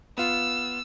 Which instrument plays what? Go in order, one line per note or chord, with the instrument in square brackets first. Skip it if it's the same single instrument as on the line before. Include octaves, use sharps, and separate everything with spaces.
[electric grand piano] B3 F4 [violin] E6